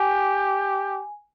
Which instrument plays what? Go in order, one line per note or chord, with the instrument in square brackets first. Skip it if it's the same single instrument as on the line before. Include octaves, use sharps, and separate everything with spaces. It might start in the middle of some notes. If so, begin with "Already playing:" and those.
Already playing: [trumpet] G4 [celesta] G#5